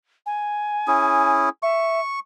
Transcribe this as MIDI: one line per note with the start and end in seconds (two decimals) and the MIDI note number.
0.26 1.33 80
0.88 1.49 61
0.88 1.49 64
0.88 1.49 68
1.63 2.00 76
1.63 2.19 85